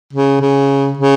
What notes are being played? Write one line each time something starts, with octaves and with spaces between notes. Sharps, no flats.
C#3
C#3
C#3